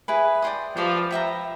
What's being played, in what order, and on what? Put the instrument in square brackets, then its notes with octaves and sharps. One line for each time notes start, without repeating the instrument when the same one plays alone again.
[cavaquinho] E4 G#4 B4
D5 G5 C6 D#6
[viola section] F3 [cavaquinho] G4 B4 D5 G5
[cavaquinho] B4 E5 G5 A#5